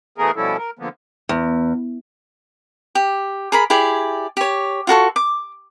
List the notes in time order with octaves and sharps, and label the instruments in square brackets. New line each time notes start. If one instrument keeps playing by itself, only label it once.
[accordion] B2 E3 A3 B3 G#4 A#4
B2 F3 G3 C#4 E4 A4
A#4
D3 F3 A#3 B3
[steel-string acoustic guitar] E2
[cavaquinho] G4
G#4 A#4 B5
E4 G4 G#4 D5
G4 C#5
F4 F#4 A4 C#6
D6